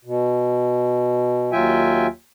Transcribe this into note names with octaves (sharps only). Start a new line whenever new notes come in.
B2
D#2 F#3 F4 E5 G5 G#5